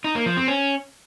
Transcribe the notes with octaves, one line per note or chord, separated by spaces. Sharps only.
D#4
A#3
F3
C4
C#4